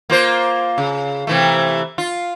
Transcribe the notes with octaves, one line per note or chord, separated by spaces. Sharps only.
A#3 F4 C5
C#3
C3 E3 A3
F4